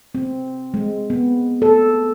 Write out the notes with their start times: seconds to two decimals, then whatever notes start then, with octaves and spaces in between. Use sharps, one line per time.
0.15 C4
0.74 G#3
1.10 B3
1.62 A4